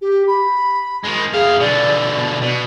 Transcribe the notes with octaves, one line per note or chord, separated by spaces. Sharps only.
G4
B5
D#3 G#3
F#2 G#4 F5
B2 D3 D5
B2